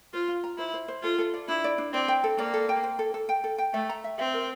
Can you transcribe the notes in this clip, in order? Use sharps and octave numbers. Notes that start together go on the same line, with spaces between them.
F4 C5
F4
A#5
E4 C5
C5
C5
F4 A4
A4
D5
D4 E4
D5
D4
C4 D5
G5
A4
A#3 D5
A4
G5
C5
A4
A4
G5
A4
G5
A3 E5
A#5
E5
C4 E5
A#4